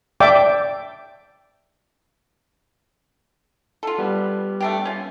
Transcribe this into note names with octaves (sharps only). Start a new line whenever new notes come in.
D5 E5 G5 D6
F4 A4
G3 B3
A3 D4 G4
C#4 F4